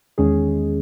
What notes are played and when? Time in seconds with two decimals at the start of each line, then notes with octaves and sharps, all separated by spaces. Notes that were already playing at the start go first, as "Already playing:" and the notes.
0.18 E2 D#3 G#3 C#4 G#4